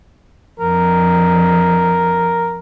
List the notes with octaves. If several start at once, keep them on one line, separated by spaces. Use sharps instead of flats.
F2 A#4